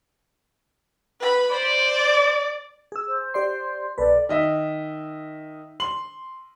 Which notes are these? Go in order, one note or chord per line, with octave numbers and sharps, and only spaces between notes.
B4 B5
C5 D5
G#4 E6
C5
G4 D5 C6
B1 A4 B4 D5
D#3 D#5 E5
C6 F#7